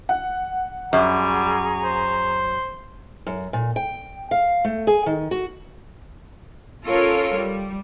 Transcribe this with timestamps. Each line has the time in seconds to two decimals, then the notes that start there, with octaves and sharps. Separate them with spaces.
0.09 F#5
0.93 F#2 G3 G#4 A#5 C#6
1.84 C5
3.27 F#2
3.53 A#2
3.76 G5
4.31 F5
4.64 A3
4.87 G#4
5.06 D#3
5.31 F#4
6.85 C#4 F4 A4 A#4 C#5
7.35 G3